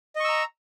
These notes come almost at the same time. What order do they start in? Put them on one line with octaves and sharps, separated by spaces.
D#5 C#6 E6 A#5